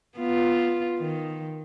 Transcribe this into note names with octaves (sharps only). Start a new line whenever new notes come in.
B3 F4
D#3